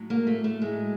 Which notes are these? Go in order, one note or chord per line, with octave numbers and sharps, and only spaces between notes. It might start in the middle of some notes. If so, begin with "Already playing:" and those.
Already playing: A2 F#3
A#3
A3
A3
A2 F#3 G#3